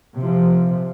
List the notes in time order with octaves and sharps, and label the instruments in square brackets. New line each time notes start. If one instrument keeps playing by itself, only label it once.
[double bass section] C3 F3